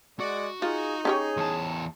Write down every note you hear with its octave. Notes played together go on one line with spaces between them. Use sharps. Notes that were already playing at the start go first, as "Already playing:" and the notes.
G#3 F#4 D5
D#4 F4 G#4
C#4 G4 G#4 C#5
E2 A5